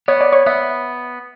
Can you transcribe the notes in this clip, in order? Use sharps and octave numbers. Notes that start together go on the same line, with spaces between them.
B3 C#5
D5
C#5
B3 E5